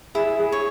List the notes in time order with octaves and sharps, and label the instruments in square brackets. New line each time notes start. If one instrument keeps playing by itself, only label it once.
[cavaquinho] E4 [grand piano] G#4
[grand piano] G#4
[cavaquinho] C#5